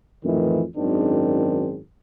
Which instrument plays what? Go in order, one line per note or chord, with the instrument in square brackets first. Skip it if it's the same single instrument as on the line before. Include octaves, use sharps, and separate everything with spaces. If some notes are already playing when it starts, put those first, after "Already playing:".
[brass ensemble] F2 A2 D#3 E3
G#1 F#2 D#3 C4 D4 G#4